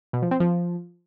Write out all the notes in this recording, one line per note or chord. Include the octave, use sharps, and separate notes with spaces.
B2
F3
C4
F3